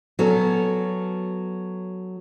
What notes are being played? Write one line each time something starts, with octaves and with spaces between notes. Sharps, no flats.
F#3 B3 C#4 A4